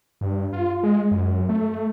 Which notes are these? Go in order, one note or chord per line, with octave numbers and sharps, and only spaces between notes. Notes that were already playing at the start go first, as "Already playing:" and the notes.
G2
F4
G#3
F#2
A3